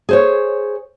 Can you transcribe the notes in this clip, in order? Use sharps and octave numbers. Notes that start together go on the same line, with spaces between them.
G#4 C5 C#5